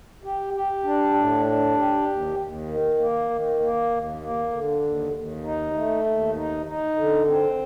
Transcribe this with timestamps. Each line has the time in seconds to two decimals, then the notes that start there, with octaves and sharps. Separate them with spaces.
0.24 G4
0.54 G4
0.84 D4
1.15 A2
1.46 D4
1.76 G4
2.07 D#2
2.37 D#2
2.68 D#3
2.98 A#3
3.30 D#3
3.60 A#3
3.90 D#2
4.21 A#3
4.51 D3
4.82 D#2
5.13 D#2
5.43 D#4
5.74 A3
6.05 D#2
6.35 D#4
6.66 D#4
6.96 D3
7.27 C4